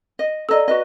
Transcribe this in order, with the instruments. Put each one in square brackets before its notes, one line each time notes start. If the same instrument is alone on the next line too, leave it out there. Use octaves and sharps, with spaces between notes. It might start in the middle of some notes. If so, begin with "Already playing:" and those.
[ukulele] D#5
[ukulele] A4 D#5 [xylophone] D5 A#5 E6
[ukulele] F#4 B4 D#5